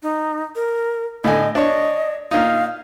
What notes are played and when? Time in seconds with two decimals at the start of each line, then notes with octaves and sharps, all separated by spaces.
0.03 D#4
0.55 A#4
1.24 A2 D3 D#5 G#5
1.55 D4 C#5 D#5
2.31 A#2 D#4 F5